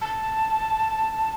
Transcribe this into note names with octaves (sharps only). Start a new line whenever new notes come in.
A5